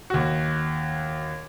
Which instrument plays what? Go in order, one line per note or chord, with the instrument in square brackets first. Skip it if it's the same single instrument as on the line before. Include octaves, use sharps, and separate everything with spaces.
[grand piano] D#2 F#4